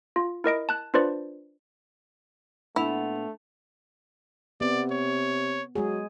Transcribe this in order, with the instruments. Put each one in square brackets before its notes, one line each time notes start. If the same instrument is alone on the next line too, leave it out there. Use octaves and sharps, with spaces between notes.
[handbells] F4
E4 A#4 D#5 D7
A5 F#6
D4 F4 B4 C5 D5
[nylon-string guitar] A#2 B3 F#5 [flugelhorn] A3 [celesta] D4 F7 [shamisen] E4
[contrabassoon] C3 [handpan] B3 [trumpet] D5
[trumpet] C#5
[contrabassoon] F#3 [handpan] G#3 G#4